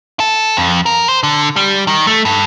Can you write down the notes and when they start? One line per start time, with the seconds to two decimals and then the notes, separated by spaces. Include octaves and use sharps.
0.20 A4
0.57 F2
0.86 A#4
1.09 C5
1.23 D3
1.56 G3
1.87 D#3
2.07 A3
2.25 G2